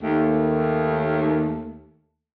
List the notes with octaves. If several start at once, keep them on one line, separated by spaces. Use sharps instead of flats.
D#2 A3